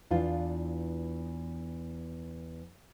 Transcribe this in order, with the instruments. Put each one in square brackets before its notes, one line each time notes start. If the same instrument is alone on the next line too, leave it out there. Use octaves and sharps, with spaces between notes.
[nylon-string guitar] E2 E3 D4 F4 F5